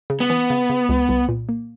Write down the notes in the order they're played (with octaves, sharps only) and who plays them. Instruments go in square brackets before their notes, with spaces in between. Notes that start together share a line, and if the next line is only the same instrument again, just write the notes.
[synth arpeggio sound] C#3
[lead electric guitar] B3
[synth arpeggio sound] E3
C#3
C#3
C#2
C2
A#2
A#3